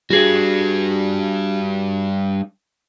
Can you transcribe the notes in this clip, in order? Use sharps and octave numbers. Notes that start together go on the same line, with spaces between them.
G3 D4 F#4 G#4